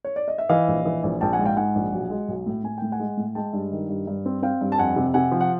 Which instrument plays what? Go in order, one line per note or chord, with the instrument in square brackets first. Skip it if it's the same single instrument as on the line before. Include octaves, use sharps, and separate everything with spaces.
[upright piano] C#5
D5
D#5
E5
E3 D#5 F5
A#1
E3
A#1
A#1 G5 A5
F#5 G#5
G#2
F5 G5
G#2 F#5 G#5
A#1
B1
G#3
B1
A2
A2 G#5
A2 G5
F#5 G#5
G#3
A2
G#3 G5 A5
G2
D#3
G2
G2
C4
C4 F5 G5
G2
A5
F2 F#5 G#5
C3
C3 F#5 G#5
F3
F#5